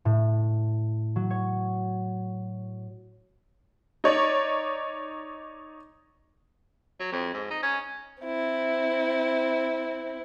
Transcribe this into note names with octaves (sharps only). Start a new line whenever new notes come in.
A2
F#3
C#5
D#4 C#5 D5
F#3
F2
G#2
D#4
C#4
C4 E4